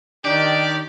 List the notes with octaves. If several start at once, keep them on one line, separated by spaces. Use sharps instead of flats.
D#3 D4 G4 D5